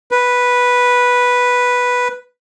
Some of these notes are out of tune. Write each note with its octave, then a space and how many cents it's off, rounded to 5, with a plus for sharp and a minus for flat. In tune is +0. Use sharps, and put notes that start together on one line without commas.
B4 -5